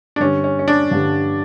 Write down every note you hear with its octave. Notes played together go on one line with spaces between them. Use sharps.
D4
G2 D3 G3 C#4
C#4
C#4
D4
G2 D3 G3